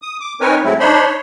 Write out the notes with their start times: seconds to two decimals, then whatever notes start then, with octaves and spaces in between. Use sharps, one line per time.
0.02 D#6
0.21 D6
0.41 C4 D#4 A#4 B4 C#5 G#5
0.64 A2 F#3 G#3 A3 C4 E4
0.80 D4 D#4 C5 C#5 B5 C6
1.06 C#5